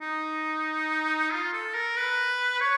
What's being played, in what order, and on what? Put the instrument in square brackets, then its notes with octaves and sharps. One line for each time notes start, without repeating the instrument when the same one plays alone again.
[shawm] D#4
F4
A4
A#4
B4
C#5